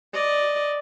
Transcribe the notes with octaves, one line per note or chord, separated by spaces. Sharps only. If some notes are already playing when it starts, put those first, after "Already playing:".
D5 D#5